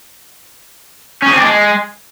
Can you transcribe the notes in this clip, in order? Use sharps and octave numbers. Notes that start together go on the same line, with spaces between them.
C#4
G#4
C4
D4
G#3